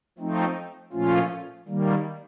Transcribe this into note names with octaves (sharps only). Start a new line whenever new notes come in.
F3 A3 C4 D#4
A#2 F3 A3 C#4 F4
D#3 G3 A#3